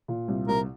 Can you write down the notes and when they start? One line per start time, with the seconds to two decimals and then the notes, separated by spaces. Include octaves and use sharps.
0.08 A#2
0.28 C2
0.48 C2 A#4